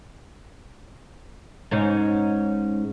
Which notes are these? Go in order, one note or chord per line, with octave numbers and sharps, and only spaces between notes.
G#2 C#4 D#4